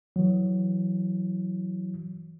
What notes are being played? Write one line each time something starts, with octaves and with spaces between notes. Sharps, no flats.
E3 F#3